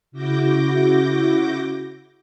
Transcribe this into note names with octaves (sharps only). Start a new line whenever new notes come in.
C#3 E4 F#4 D6 G6 A#6